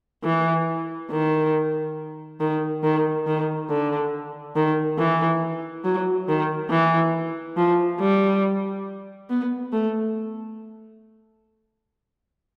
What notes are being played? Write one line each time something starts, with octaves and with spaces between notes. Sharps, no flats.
E3
D#3
D#3
D#3
D#3
D3
D#3
E3
F#3
D#3
E3
F3
G3
B3
A3